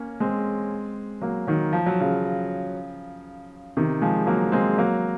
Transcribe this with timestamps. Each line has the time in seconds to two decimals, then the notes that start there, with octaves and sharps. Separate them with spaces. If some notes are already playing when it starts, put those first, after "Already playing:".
Already playing: A#3 C#4
0.20 G#3 C4
1.22 F#3 A#3
1.47 D#3 F#3
1.73 F3
1.86 F#3
2.01 C#3 F3
3.77 C3 D#3
4.02 F3 G#3
4.27 F#3 A#3
4.52 G#3 C4
4.78 F#3 A#3